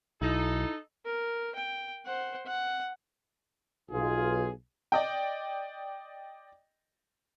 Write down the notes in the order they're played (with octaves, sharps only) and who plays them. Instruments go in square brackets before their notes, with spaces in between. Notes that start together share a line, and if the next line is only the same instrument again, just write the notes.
[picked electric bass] B1 [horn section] D#4 A4 [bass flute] E4
[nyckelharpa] A#4
G5
C5 F#5
F#5
[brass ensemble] B1 F4 G#4
[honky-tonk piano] D5 D#5 G5